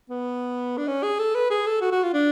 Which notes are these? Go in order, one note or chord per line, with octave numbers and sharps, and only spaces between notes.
B3
D4
C#4
G#4
A4
B4
G#4
A4
F#4
F#4
F4
D4